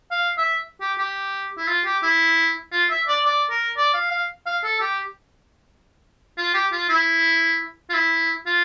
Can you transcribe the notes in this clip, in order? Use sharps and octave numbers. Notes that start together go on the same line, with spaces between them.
F5
E5
G4
G4
E4
F4
G4
E4
F4
E5
D5
D5
A#4
D5
F5
F5
F5
A4
G4
F4
G4
F4
E4
F4
E4
F4